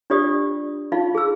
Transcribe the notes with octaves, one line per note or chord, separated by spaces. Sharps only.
D4 F4 G4 D5 D#6
D#4 F4 F5
G#4 E6